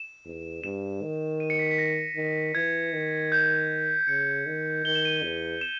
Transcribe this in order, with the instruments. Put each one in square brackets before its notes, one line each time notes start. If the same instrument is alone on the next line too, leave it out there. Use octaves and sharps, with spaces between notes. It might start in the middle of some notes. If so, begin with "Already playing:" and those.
Already playing: [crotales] E7
[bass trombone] E2
[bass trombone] G2 [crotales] E7
[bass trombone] D#3
[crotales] D#7
C#7
B6
B6
A#6
[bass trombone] D#3
[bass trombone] E3 [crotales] G#6
[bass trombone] D#3
[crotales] G6
[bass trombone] C#3 [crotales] C#7
[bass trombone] D#3
[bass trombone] D#3 [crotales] G7
[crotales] E7
D#7
E7
[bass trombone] E2
[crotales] E7